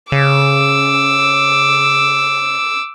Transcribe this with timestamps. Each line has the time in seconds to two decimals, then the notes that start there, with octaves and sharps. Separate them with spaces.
0.12 C#3 D6 E6